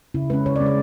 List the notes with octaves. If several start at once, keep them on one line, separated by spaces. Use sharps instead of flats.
C#3 E4
G#3 C#4 B4
C#3 C#5
D5
G#3 C#4
D5